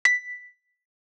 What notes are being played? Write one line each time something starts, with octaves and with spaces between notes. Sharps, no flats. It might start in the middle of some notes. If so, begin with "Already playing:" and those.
B6